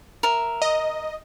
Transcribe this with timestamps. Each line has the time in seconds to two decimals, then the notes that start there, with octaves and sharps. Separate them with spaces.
0.23 A#4 E5
0.62 D#5